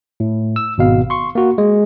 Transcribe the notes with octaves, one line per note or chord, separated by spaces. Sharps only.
A2
E6
G#1 B2 F5
C6 C#6
A#3 F#4
G#3